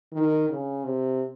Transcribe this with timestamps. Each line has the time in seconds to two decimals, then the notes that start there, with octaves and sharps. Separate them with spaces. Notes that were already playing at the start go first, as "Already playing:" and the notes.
0.13 D#3
0.49 C#3
0.84 C3